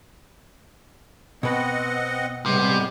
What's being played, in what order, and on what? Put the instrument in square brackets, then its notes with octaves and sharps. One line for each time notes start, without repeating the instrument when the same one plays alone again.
[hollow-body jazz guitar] B2 B4 [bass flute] B3 [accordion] C4 D#5 F#5
[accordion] A2 G#3 B3 [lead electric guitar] C3 [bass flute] G3